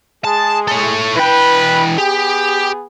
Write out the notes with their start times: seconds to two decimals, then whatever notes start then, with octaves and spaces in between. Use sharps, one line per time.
0.25 G#3 G#4 A5
0.68 A4 C#5
1.16 E3 B4 G5
1.98 B3 G4 G#4